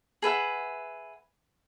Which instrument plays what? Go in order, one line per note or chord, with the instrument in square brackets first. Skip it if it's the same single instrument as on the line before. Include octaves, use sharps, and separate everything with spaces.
[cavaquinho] G#4 B4 E5 F#5